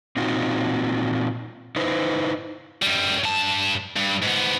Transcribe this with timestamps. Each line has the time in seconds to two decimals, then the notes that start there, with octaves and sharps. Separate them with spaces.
0.16 A#2 C4 D#4 F4 F#4
1.76 D#4 E4 B4 C5
2.82 F#2 G3
3.24 G2 A5
3.96 G2
4.22 G#2 B3